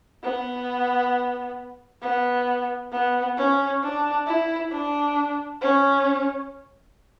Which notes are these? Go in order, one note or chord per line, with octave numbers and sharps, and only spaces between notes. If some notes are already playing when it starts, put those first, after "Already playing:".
B3
B3
B3
C#4
D4
E4
D4
C#4